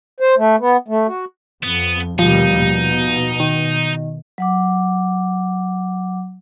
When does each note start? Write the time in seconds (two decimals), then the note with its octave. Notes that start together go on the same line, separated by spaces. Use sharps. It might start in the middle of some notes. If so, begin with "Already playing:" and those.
0.20 C5
0.38 A3
0.59 B3
0.88 A3
1.07 F#4
1.63 F2 B3
2.19 D#2 B2 F3 G3 D#4
2.61 B2
3.40 D#3
4.38 F#3 F#5 D6